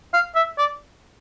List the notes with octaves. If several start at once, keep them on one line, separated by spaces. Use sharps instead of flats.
F5
E5
D5